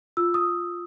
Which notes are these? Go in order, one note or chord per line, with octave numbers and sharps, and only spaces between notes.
F4 E6
D#6